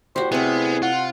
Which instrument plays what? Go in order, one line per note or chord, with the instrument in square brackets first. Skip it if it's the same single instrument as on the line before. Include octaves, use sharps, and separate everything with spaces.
[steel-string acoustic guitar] E2 A2 [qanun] F#4 G4 [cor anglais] C5
[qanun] C3 C4 [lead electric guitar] B3 [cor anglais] G#4
[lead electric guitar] F4 [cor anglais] F#5